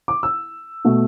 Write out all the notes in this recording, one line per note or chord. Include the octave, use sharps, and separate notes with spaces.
D6
E6
B2 A3